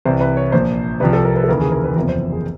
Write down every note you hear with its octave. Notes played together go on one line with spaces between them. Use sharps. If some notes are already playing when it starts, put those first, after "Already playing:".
C2 C3 E3 C5
B4
C#5
A#1 A#2 F3 C5
C2 C3 F3 B4
A4
A#4
B4
A4
D#2 C#3 E3 A#4
G#4
A#4
B4
F#1 E2 C3 F3 A#4
C5
G#4